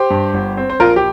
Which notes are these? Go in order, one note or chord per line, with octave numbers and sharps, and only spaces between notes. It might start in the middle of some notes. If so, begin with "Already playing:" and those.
Already playing: G4 C5
G2
G1
C4
C5
A#1 F4 A#4
G4